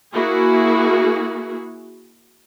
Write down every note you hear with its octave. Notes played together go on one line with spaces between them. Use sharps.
A#3 E4 F#4 G#4